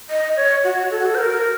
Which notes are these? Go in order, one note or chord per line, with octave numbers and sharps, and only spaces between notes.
D#5
C#5
F#4
A4
F#4
A4
C5
A#4